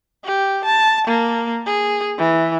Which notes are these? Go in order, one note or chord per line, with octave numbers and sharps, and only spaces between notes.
G4
A5
A#3
G#4
E3